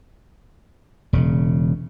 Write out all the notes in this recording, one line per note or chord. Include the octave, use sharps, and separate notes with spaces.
E1 C#3